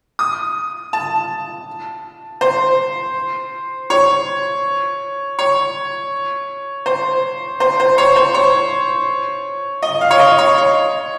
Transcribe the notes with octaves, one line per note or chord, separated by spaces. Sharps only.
D#6
A5
C5
C#5
C#5
C5
C5
C5
C#5
C5
C#5
D#5
F5
C#5
D#5
C#5
C#5